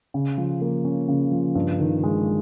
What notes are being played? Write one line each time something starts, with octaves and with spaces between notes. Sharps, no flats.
C#3
F3
A#3
C#4
C#3
F3
G2
D#3
G#3